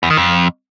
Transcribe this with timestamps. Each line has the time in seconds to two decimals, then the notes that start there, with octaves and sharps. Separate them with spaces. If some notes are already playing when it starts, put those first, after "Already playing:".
0.03 E2
0.10 D#3
0.17 F2